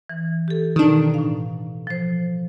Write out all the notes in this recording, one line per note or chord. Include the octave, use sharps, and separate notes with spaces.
E3
G4 A4
B2 D#3 D4
A2 F5
F3 C5